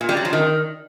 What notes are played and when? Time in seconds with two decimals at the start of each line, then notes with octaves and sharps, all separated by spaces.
0.01 A#2
0.09 G3
0.17 F#3
0.25 F3
0.33 D#3